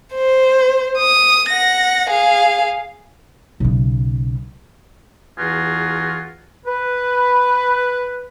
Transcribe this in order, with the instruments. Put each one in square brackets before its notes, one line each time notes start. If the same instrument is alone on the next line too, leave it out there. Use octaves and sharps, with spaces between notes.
[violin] C5
D#6
F#5 A#6
G#4 F5
[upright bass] B1 C#3
[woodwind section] E2 E3 F4 F#4 G#4
B4